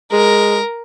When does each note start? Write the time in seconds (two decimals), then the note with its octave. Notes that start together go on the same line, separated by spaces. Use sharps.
0.12 G#3 A#4